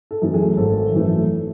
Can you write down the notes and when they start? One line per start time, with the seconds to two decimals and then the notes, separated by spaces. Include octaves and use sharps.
0.11 A4
0.22 F#2 E3 A3
0.34 G#4
0.57 G#1 A4
0.92 F#2 E3 A3